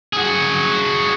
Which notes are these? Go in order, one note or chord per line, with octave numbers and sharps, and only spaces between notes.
F#4 G#4